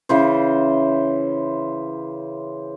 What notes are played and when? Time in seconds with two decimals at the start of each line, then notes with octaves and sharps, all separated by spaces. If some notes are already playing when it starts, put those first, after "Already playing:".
0.09 C#3 E3 C5